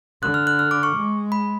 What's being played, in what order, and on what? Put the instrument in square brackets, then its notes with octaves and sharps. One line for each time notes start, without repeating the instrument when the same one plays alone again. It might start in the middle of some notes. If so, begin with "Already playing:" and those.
[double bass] D3 [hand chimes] F#6
[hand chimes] F6
F#6
F6
D6
C#6
[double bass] G#3
[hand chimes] B5